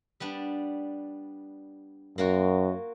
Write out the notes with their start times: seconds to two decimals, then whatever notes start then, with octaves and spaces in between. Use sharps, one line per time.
0.20 G3 B3 D4
2.18 F#2 A#3 F4 F#4